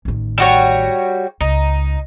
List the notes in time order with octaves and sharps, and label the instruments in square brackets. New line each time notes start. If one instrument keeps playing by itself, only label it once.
[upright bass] A1 D#3
[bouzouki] G3 F#4 C#5
[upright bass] C#2 [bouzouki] D#4